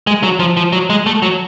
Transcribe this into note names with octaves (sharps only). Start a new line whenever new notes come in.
G#3
F#3
F3
F3
F#3
G#3
A3
F#3